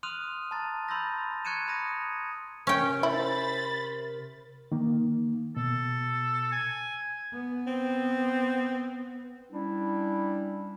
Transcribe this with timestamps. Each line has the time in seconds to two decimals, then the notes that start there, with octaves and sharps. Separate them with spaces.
0.03 C6 D#6 F6 F#6 D#7 F7
0.51 A5 A#5 C6 A6
0.88 B5 C6 E6 G6 A6 A#6
1.45 C#6 F#6 G#6 C#7 D#7 E7
1.68 B5 D#6 G#6 A#6 D#7
2.67 C3 C#4 A#4 G5
3.03 E4 C5 B5 A6
4.72 D#3 A#3
5.56 B2 A4
6.52 G#5
7.33 B3
7.67 C4
9.51 G3 C#4 D4 E4